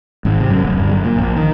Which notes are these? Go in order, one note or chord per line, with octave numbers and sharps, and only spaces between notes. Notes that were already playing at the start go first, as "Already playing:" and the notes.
G#1
C3
F#2
D1
G1
F#2
A#2
A#1
D#3